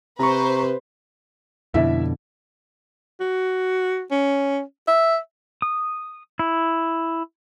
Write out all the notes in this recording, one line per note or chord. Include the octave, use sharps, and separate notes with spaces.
C3 B4 C5 A#5 C#6
F2 B2 D3 E4 E5
F#4
C#4
E5
D#6
E4